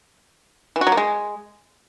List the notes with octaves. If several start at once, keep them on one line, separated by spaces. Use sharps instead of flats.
E3
F#4
F#3
A#3
G#3